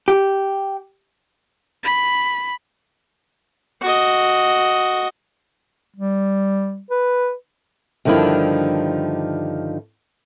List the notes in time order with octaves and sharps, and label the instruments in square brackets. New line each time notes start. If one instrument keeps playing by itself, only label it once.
[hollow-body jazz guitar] G4
[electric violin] B5
[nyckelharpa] F#4 D#5
[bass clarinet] G3
B4
[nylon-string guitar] G2 D3 D#3 F3 D4 E4